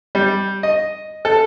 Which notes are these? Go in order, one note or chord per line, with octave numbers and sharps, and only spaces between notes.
G3
D#5
A4